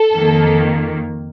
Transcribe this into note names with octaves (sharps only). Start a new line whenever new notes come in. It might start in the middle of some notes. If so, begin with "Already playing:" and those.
Already playing: A4
F2 D#3 A#3